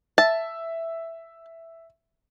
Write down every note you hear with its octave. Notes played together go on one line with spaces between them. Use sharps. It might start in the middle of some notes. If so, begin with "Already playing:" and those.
E5 A5